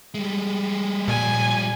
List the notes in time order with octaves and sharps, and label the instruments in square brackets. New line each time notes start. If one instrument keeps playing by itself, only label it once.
[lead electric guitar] G3 G#3
[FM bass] A#2 [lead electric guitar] F3 G3 [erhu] G#5